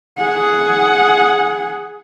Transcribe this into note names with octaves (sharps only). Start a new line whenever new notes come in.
G#4 F#5